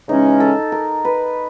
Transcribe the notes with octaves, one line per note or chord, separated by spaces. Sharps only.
C#3 E3 G#3 C#4 D#4
A4
A#4
B4